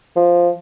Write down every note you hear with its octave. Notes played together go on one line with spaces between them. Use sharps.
F3